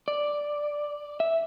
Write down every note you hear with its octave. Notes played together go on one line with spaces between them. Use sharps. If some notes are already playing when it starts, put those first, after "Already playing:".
D5
E5